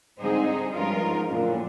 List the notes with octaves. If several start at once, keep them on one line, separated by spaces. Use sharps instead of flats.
G#2 D3 G3 C4 D#4 G#4
G2 F3 G#3 C#4 F4 A#4
G#2
F#2 A#2 D3 F3 A3 D4
A2